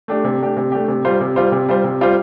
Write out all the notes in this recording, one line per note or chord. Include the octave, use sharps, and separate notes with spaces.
A3 D4 G4
C3
A3 D4 G4
C3
A3 D4 G4
C3
G3 F4 C5
C3
G3 F4 C5
C3
G3 F4 C5
C3
G3 F4 C5